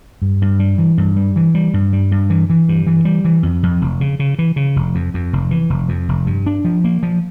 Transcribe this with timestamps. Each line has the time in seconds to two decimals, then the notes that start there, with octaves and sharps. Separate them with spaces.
0.22 G2
0.42 G2
0.59 G3
0.78 E3
0.98 G2
1.16 G3
1.36 E3
1.55 G3
1.74 G2
1.93 G3
2.12 G2
2.30 E3
2.50 E3
2.68 G2
2.87 E3
3.05 G3
3.25 E3
3.43 F2
3.63 F2
3.81 F1
4.01 C#3
4.20 C#3
4.39 E3
4.56 C#3
4.76 F1
4.95 F2
5.14 F2
5.33 F1
5.51 E3
5.70 F1
5.89 F2
6.09 F1
6.26 G2
6.46 D4
6.65 F3
6.84 A#3
7.03 F3